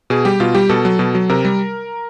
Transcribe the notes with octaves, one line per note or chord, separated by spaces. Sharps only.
B2 G#4
G3 G4
B2 F4
G3 G4
B2 A4
F#3
B2
F#3
C3 A#4
G3